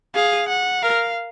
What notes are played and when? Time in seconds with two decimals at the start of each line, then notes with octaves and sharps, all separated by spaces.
0.15 G#4 F5
0.48 F#5
0.83 A#4 F5